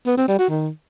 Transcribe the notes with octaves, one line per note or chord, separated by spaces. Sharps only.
B3
C4
G3
F#4
D#3